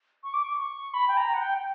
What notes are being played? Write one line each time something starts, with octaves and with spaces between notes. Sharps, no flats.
C#6
D6
C#6
C#6
B5
G5
A#5
F#5
G5
G5